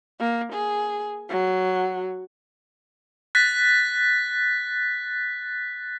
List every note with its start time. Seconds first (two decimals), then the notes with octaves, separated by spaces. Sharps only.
0.20 A#3
0.53 G#4
1.29 F#3
3.35 F#6 A6 B6